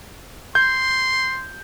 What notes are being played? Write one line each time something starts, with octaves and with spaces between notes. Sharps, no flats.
C6 G6